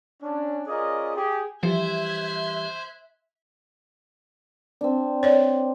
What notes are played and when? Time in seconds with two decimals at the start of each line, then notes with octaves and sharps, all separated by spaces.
0.21 C#4 D4
0.67 C#4 F4 G#4 A#4 D5 D#5
1.15 G4 G#4
1.63 E3 F3 G3 G4 C5 E5 F#6 G#6
4.81 C4 D4
5.23 C#5 D5